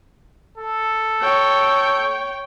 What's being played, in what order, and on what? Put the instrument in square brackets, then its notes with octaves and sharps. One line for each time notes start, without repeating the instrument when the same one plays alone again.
[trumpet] A4
[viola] C#5 G5